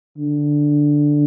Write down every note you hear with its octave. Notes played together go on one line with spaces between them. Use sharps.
D3